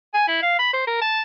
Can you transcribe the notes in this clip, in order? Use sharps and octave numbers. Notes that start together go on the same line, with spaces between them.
G#5
E4
F5
B5
C5
A#4
A5